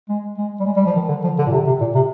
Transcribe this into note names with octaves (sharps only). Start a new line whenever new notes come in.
G#3
G#3
G3
G#3
G3
F3
D#3
D3
F3
D3
A#2
C3
C3
A#2
C3